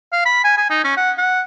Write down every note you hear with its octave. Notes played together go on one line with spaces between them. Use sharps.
F5
B5
G#5
G#5
D#4
C#4
F#5
F#5